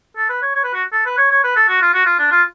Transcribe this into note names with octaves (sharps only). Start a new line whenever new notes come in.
A4
B4
C#5
C#5
B4
F#4
A4
B4
C#5
C#5
B4
A4
F#4
F4
F#4
F4
D4
F4